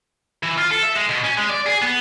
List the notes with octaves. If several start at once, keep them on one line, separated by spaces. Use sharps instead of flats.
E3
F4
A4
E5
G#3
B2
C#4
G#3
D5
G#4
B3